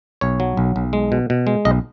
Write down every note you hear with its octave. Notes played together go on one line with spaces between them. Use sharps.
B1 C#5
F#3
B1
B1
G#3
B2
B2
G#3
B1 D#5